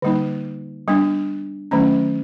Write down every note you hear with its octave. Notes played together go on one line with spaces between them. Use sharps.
D3 G3 A#3 D#4
G3 B3 D4
D#3 F#3 A3 C#4